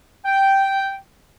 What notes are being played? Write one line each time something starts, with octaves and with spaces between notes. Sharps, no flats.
G5